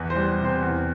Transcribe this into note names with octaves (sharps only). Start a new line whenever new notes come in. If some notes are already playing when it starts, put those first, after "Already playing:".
Already playing: E2 E3
C5
G3
C3
C5
E2